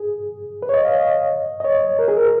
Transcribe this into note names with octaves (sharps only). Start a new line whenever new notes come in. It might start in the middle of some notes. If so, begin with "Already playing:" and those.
Already playing: G#4
B4
C#5
D#5
F5
D#5
D#5
C#5
A#4
G#4
A#4